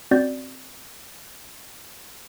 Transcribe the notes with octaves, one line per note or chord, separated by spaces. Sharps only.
C4 C#4 F#4 D5 G6 A6